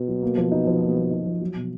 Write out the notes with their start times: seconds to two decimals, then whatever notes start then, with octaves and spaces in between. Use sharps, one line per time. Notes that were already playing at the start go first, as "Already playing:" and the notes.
Already playing: B2
0.08 F#3
0.23 A#3
0.37 F3
0.52 D#4
0.67 F3
0.82 A#3
0.97 F3
1.11 D#4
1.26 F3
1.41 F#3
1.56 B2